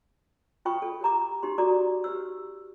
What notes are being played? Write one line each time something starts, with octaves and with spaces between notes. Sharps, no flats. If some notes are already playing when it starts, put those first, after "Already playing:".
F4 B4 G5 B5 C#6 D#6
A4
G4 A#4 A#5 D6
D#4 G4 C6
F#4 A4 D5 A#5 D6 D#6
G4 B4 E6